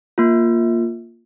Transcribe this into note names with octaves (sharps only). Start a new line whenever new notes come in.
A#3 F4